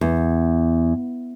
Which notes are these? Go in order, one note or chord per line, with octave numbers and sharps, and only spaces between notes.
E2